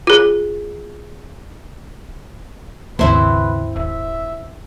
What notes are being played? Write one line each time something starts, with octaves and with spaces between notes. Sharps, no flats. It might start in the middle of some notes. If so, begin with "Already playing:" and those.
F4 G#4
G#1 D#2 C#3 A#3 C4 E4 B4 C5
D#1 E5